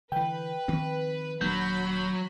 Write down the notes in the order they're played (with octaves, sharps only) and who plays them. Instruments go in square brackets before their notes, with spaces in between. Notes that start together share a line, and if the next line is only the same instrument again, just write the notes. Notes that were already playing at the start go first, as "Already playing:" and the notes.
[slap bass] D3 E3 [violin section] B4 [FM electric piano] G5
[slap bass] D#3 F3 C4
[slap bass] D#1 A#3 D4 [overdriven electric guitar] F#3 [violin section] B5 [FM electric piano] G6